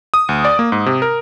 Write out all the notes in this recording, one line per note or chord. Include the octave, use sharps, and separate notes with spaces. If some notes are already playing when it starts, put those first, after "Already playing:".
D#6
D2
D5
A#3
G#2
C3
A#4